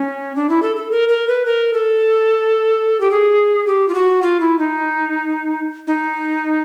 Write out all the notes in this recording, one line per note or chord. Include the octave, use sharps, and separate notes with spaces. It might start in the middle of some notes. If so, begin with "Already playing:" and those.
Already playing: C#4
D4
E4
A4
A4
A#4
A#4
B4
A#4
A4
G4
G#4
G4
F4
F#4
F4
E4
D#4
D#4